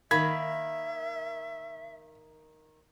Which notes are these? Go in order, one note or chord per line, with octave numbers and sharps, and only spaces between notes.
D#3 A#3 E5 B5 G#6